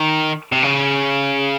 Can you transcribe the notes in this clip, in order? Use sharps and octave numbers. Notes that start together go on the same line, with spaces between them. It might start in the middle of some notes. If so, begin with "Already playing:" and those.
Already playing: D#3
C3
C#3